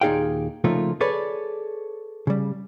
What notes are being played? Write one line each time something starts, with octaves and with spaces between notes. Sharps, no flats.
D#2 A#2 D#4 G#4 F5 G5
C#3 F3 A3 A#3 D#4 F4
G#4 A4 B4 C#5 D5
C#3 G3